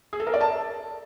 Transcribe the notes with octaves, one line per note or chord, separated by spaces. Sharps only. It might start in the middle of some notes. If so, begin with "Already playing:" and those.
G#4
A4
A#4
D5
A5